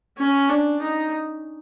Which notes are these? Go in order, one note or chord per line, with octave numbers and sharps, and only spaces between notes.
C#4
D4
D#4